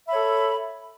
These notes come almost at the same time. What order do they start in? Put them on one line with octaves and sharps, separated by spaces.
E5 B5 C#5 A4